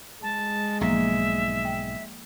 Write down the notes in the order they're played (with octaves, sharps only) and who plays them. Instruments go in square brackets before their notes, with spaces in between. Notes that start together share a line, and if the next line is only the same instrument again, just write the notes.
[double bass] G#3 [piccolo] A5
[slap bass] B1 G#2 [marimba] F3 A#3 [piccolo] E5
[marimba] G5